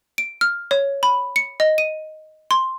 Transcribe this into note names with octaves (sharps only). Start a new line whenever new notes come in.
D7
F6
C#5
B5
C#7
D#5
D#7
C6